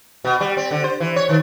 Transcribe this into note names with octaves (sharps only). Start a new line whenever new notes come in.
B2
G3
C4
D3
C5
E3
C#5
D#3